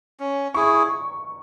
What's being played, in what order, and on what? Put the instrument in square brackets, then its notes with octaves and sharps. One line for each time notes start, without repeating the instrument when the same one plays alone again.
[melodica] C#4
[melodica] E4 G#4 [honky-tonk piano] C#6